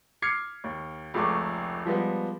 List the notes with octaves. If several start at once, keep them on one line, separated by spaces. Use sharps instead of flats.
D6 F6 G#6 C7 C#7
D#2
F1 C#2 G#3 A3 C#6 D6
F3 G3 G#3 B3